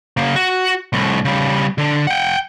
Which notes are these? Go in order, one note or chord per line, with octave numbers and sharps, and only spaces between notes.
C#3 A#3
F#4
C2 A2
C#3 G3
D3
F#5 G5